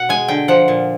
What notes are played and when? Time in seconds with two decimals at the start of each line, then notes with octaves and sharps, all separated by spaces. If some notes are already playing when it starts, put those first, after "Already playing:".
Already playing: B2 F#5
0.09 G#3 G#5
0.28 D3 G5
0.48 F3 F#5
0.68 A#2